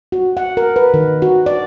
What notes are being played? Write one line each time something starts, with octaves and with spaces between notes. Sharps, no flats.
F#4
F#5
A#4
B4
D#3
F#4
D5